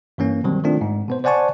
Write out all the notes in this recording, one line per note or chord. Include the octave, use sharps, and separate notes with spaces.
G2 E3 A#3 C#4
B2 D#3 F#3 G3 C4
D#3 A3 C4 D4 F4
G#2
B2 B3 C5
C5 D5 F#5 G#5 A5 C#6